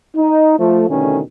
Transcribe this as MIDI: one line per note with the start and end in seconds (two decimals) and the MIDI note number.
0.16 0.55 63
0.59 0.85 53
0.59 0.85 57
0.89 1.21 40
0.89 1.21 47
0.89 1.21 50
0.89 1.21 51
0.89 1.21 57
0.89 1.21 61